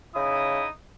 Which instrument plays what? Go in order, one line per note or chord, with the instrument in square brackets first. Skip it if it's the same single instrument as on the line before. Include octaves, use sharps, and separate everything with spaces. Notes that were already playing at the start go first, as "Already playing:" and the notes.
[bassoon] C#3 [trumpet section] D#4 E4 D#6